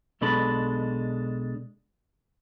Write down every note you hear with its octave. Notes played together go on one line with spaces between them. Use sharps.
B1 B2 G#3 D4 A4 B5